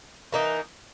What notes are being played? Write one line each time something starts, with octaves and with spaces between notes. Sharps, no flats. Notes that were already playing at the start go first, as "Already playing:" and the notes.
E3 A#3 D#4